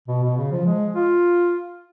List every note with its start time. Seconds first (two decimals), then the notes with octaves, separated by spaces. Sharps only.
0.08 B2
0.23 B2
0.37 C#3
0.51 F3
0.66 G#3
0.95 F4